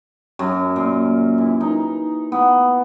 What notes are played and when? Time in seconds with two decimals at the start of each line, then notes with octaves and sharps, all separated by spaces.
0.39 F#2
0.76 A#2
1.38 E3
1.61 D#4
2.32 B3